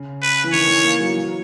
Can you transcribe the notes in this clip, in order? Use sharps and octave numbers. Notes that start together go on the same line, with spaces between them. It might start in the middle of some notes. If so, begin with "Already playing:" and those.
Already playing: C#3
B4
E3
D#3 C#5
E3
A#3
F#3
E3
F#3